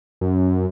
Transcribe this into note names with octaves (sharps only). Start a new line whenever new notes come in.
F#2